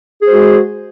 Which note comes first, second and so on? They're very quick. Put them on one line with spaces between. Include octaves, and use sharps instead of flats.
G#4 C5 G#3 F#4